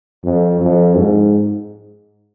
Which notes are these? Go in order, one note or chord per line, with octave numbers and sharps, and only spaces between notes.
F2
F2
G#2